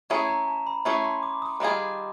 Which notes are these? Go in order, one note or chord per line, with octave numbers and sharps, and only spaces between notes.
A3 C#4 E4 G#4 A#5
A#5
A5
B5
A3 C#4 E4 G#4 B5
C6
D6
D#6
D#3 G3 C4 F4 G#4 D6